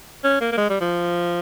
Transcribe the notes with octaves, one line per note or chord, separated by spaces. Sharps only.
C#4
A#3
A#3
G#3
G3
F3